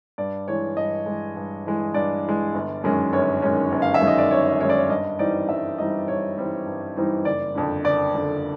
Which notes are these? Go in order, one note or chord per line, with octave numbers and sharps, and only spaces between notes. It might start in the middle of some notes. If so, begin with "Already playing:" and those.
G2 D5
E3 G#3 C#5
G2 D#5
E3 G#3
G2
E3 G#3
G2 D5
E3 G#3
G1
F#2 D#3 G#3 C#4
G1 C#5
F#2 D#3 G#3 C#4
G1
F5
E5
F#2 D#3 G#3 C#4
D#5
D5
G1 C#5
F#2 D#3 G#3 C#4 C#5
D5
C#5
G2 D#5
E3 G3 C4 D#4 D5
G2 E5
E3 G3 C4 D#4 D#5
G2 C#5
E3 G3 C4 D#4
G2
E3 G3 C4 D#4
F#1 D5
F2 D3
F#1 D5
F2 D3